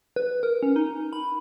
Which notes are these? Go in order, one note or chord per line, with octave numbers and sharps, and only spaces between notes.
B4
A#4
C#4
D#4
B5